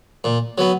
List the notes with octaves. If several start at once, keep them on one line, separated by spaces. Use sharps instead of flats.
A#2
F#3 B3